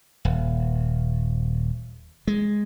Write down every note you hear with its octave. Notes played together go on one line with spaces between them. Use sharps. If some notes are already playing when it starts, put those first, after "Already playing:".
D#1
G#3